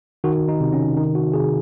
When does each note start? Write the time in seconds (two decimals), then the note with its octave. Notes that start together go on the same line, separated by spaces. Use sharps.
0.24 D#3 F#4
0.49 D#4
0.60 C3
0.73 C#4
0.97 D#3 D#4
1.15 F#4
1.33 C3 G#4